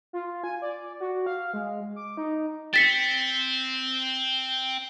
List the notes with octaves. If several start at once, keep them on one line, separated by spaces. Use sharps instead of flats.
F4
G#5
D5
F#4
F5
G#3
D6
D#4
C4 A6 B6 C#7